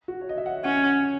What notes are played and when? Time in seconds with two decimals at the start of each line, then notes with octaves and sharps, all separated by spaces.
0.08 F#4
0.21 C#5
0.29 D#5
0.37 E5
0.46 F#5
0.64 C#4 F#5